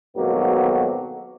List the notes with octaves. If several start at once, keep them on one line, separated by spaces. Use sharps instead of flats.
F2 G#2 B2 D#3 F#3 A#3